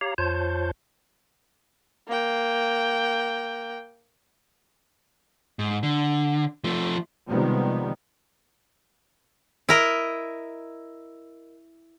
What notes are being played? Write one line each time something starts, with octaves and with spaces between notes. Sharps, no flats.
G4 C#5 F5 A#5
F2 F4 C5 C#5 A5 G6
A#3 G5
G#2
D3
F3 A3
C3 D#3 F3 G3 G#3 B3
E4 A#4 D#5